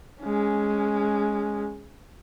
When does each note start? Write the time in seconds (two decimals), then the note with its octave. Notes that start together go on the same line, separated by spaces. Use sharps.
0.21 G#3 C#4